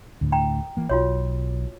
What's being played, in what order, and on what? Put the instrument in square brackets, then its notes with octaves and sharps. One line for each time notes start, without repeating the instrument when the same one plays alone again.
[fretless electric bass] D2 A2 D3
[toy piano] G5 A#5
[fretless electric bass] E3 A#3
[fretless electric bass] B1 [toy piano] F4 F#4 C#5